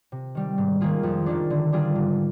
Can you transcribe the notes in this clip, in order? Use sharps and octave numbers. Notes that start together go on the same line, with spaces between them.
C3
D#3 G3
G#2
D#3 A#3 F4 G#4
F2
D#3 A#3 D4
D3
G3 D4 F4 G#4
G#2